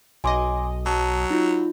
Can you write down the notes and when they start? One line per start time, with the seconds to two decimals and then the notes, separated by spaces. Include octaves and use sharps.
0.24 B1 D#5 G#5 C6 D6
0.86 F#3 A5
1.30 D#4 F4